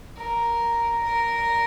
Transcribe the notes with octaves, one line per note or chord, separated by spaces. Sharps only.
A#4
A#4